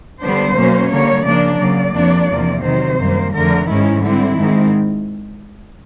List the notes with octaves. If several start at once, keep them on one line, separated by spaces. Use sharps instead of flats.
D3 G3 B3 D4 C5
B2 F#3 A#3 C#4
D3 G3 A#3 C#5
C#3 F3 A#3 D4 D5
C#3 F#3 A#3 D5
F2 C3 F3 A#3 D4
E2 C3 F3 A#3
C3 D#3 F#3 C5
F#2 D#3 G3 A#3
F2 D3 F3 A3 A#4
G#2 D#3 G#3 C#4 E4
D3 G3 C4 E4
G#2 D#3 G#3 C4